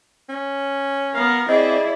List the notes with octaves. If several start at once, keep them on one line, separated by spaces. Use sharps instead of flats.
C#4
B3 A#4 F5
C4 E4 G#4 D5 D#5